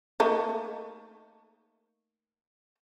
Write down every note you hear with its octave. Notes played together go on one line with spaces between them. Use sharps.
A3 A#3 D#4